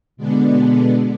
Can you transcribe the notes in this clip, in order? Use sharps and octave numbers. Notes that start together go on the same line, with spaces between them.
B2 D3 G#3 B3 D4